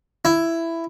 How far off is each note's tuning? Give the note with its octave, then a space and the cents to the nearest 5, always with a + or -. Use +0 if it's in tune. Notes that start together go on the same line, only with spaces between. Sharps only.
E4 +10